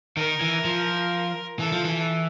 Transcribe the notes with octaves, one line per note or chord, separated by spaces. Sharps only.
D#3 A#4
E3
F3
E3 A4
F3
E3